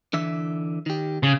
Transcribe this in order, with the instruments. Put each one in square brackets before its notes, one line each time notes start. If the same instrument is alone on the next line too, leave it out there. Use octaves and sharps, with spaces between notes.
[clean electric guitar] D3 E3 E5
D#3 G4
[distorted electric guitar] C#3